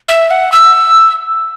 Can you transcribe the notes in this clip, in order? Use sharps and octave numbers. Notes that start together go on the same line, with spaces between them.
E5
F#5
E6